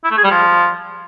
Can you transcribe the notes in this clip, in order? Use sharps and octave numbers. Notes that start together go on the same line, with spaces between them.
E4
A3
G#4
G3
F3